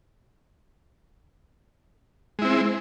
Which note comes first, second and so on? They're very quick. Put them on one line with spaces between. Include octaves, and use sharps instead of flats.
G#3 E4 C4